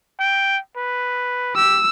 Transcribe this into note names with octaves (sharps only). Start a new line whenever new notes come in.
G5
B4
G4 E6